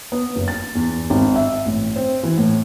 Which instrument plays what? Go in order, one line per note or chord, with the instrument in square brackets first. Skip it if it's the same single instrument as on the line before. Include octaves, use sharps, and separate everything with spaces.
[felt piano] B3
F#1
A6
E2
G#1
E5
A1
C4
E3
A2